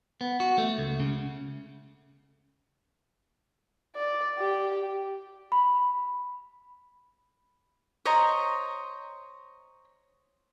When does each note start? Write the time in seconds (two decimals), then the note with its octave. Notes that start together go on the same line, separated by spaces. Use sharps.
0.21 B3
0.40 F#4
0.58 A3
0.78 C#2
1.00 C#3
3.96 D5
4.39 G4
5.52 B5
8.05 C5 C#5 D#5 A#5